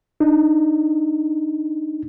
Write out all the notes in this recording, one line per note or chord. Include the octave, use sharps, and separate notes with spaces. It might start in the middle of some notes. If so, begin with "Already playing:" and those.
D4 D#4